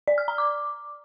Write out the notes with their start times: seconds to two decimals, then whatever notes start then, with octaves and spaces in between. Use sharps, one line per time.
0.08 D5
0.18 F6
0.28 A#5
0.38 D6